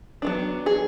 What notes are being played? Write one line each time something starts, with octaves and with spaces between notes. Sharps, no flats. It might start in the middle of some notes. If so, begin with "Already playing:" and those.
F#3 B3 D4
G#4